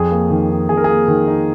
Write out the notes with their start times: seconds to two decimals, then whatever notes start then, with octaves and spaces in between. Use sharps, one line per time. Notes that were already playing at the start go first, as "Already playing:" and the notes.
Already playing: F2 G#4
0.11 A#3
0.30 D#3
0.50 D#4
0.69 F2 G#4
0.77 A#4
0.84 A#3 G#4
1.08 D#3
1.27 D#4